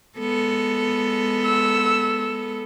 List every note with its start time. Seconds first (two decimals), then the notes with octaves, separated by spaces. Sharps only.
0.19 G#3 B3 A4
1.44 E6